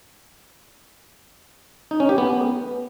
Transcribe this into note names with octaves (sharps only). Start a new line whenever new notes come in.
D#4
C#4
G4
B3